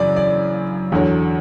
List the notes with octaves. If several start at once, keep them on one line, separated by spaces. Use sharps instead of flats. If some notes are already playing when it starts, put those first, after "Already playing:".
Already playing: F#2 C#3 E3 D5
D5
E2 D3 F#3